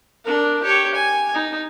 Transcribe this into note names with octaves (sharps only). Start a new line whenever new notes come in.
D4 A#4
G4 C#5
G#5
D#4